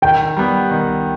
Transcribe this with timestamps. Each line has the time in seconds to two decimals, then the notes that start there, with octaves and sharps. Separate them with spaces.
0.02 D#3 G5
0.37 G3 B3
0.71 D#3